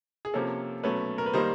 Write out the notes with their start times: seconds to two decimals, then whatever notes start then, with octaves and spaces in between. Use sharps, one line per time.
0.25 G#4
0.34 C3 F3 A#3 C#4 A4
0.83 B2 F#3 A3 C#4 B4
1.18 A#4
1.26 B4
1.33 D#3 G3 A#3 D#4 C5